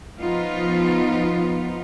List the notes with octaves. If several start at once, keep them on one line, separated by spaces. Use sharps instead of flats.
F3 B3 D#4 F4